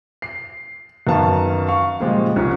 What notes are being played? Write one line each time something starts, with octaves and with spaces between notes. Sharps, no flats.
C7
F#2 D#3 B3 C#4 F5 A5
F5 C#6
A#2 C#3 F3 G3 G#3
C2 F3 C#4